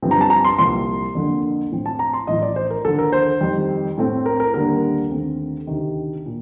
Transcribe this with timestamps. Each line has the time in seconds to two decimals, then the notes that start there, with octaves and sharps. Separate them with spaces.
0.02 G1 G2 F3 C4
0.11 A#5
0.21 A5
0.30 A#5
0.45 C6
0.59 C2 A#2 F3 C6
1.15 F2 D3 F3 A#3
1.71 A2 F3 C4
1.86 A5
1.99 A#5
2.13 C6
2.27 A1 A2 F3 D#5
2.42 D5
2.56 C5
2.71 A#4
2.85 D#2 D3 F3 A4
2.99 A#4
3.12 C5
3.41 F2 D#3 G3 C4
3.97 A2 A3 C4
4.26 A#4
4.40 A#4
4.54 D#2 D3 G3 A#3 D4 A#4
5.10 D#2 D3 A3 C4
5.67 D2 C3 D#3
6.26 A#2